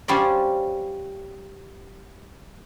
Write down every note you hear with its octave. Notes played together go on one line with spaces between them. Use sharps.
G3 C#4 F4 C5 D5